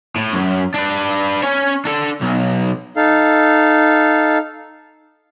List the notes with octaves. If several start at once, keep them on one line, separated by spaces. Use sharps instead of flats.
A2
F#2
D4 B4
C#4 C#5
D4 A4
B1
D#4 A4 F5